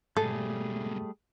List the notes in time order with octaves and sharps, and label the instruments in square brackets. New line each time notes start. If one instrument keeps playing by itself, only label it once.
[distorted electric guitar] G#2 B2 [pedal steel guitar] G3 A3 G#4 [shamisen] A4